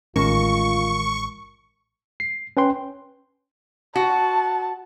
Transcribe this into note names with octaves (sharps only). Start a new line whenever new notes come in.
A1 D#3 G#3 C#4 F4 A#4 C#6
C7
C#4 B4 G5 C6
F#4 A5